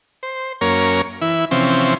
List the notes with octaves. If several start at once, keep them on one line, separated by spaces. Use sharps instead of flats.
C5
F#2 A#3 C#4 A#4 C#5
E3 E4
C3 E3 F3 C4 C#4